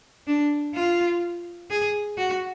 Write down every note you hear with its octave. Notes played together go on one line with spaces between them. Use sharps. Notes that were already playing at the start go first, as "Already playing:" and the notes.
D4
F4
G#4
F#4